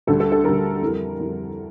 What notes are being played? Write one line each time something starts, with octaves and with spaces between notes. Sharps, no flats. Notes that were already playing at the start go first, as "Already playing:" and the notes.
D2 D3 G3 A4
A4
A4
D2 D3 G3 A#4
F2 E3 G3
F2 E3 G3